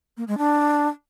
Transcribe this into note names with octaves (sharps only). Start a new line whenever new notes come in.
A#3
G#3
D4